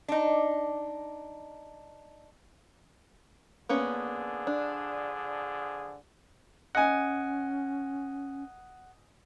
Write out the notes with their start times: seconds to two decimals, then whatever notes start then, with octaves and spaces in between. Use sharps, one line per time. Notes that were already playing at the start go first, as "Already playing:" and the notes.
0.08 D4 D#4
3.69 D3 F3 A#3 B3 C#4 G#4
4.47 D4
6.75 C#4 D#5 F#5 G#5